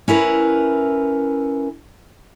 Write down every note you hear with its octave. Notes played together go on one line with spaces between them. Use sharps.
C#4 E4 A#4 B4